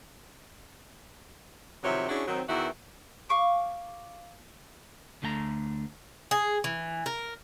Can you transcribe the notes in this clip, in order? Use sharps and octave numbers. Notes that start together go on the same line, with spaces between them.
C3 D#3 F3 F#3 C#5 E5
C#4 D4 E4 F#4 G#4
D#3 F#3 C4
E2 D#3 E3 F#4 E5
F5 C#6 D6
D2 D3 A3 G5 A#5
G#4
E3
A#4